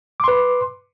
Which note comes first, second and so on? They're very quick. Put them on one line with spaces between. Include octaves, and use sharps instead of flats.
D6 C6 B4